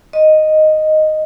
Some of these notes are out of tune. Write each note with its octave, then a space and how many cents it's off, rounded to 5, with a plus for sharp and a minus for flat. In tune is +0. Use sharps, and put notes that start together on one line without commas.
D#5 -5